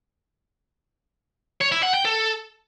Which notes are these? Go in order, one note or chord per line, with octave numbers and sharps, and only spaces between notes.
C#5
E4
F#5
G5
A4